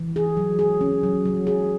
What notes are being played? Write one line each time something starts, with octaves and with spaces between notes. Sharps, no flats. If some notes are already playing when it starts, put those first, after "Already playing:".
Already playing: E3
G#4
F#3
G#4
C#4
F#3
F#3
G#4